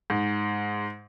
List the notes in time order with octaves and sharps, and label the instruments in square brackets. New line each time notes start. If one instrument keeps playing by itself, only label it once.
[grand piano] G#2